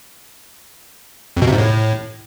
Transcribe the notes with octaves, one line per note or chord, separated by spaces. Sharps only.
F2
B2
C3
G#2
A2